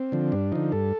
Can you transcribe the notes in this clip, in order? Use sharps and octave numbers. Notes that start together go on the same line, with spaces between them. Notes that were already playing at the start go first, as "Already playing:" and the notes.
Already playing: C4
D3 F3
G2 D4
D3 F3 D#4
G2 A4